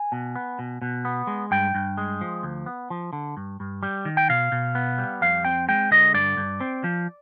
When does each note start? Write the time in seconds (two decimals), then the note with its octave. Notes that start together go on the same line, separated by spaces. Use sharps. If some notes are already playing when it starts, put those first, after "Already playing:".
Already playing: G#5
0.12 B2
0.36 B3
0.59 B2
0.82 B2
1.05 B3
1.27 G#3
1.51 G2 G5
1.75 G2
1.97 G#3
2.21 F3
2.43 D2
2.66 B3
2.90 F3
3.13 D3
3.37 G2
3.60 G2
3.83 G3
4.05 D#3
4.17 G5
4.29 B2 F5
4.52 B2
4.75 B3
4.98 G3
5.21 F2 F5
5.45 C4 G5
5.68 G#3 G5
5.91 D3 D#5
6.14 G2 D5
6.37 G2
6.60 C4
6.84 F3